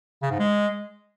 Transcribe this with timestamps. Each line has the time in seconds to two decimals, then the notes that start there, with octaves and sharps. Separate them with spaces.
0.23 C#3
0.31 G#2
0.39 G#3